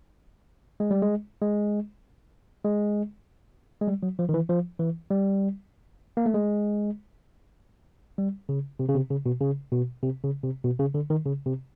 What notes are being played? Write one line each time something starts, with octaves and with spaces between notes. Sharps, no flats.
G#3
G3
G#3
G#3
G#3
G#3
G3
F#3
F3
D#3
E3
F3
E3
G3
A#3
A3
G#3
G3
C#3
C3
C#3
C3
C#3
B2
C#3
B2
C3
C#3
C3
B2
C#3
D3
D#3
C#3
C3